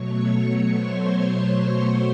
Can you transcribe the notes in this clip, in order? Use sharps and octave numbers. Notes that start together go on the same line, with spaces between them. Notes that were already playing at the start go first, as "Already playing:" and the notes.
Already playing: B2 F#3 A3 C#5 C#6
C5 C6
C#5 C#6